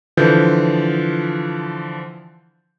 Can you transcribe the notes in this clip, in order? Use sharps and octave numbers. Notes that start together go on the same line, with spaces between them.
D3 E3 F3 F4 G6